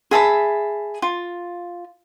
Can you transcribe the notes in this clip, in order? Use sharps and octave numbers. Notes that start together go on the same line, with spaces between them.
G#4 E5 A5 B5
F4